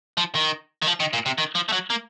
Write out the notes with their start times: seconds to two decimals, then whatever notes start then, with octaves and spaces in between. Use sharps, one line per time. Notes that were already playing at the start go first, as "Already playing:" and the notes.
0.17 F3
0.35 D#3
0.82 D#3
0.87 F3
1.00 D#3
1.13 A#2
1.26 C3
1.38 D#3
1.55 F3
1.69 A3
1.72 F#3
1.90 A#3